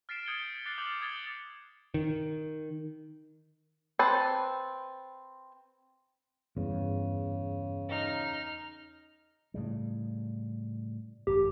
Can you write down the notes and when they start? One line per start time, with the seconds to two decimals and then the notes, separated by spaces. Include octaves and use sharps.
0.09 F6 A6 B6 C7 D7 E7
0.26 D#6 G6 G#6 C#7 D7 G7
0.66 D6 F#6 A6 C7 C#7
0.78 D6 F6 G6 F7 F#7
1.01 D#6 G#6 A6 G7
1.94 D#3
3.99 C4 B4 A5
6.57 E2 G2 C#3
7.88 D#4 F6
9.54 A2 C#3 G3
11.27 G#1 F#2 G4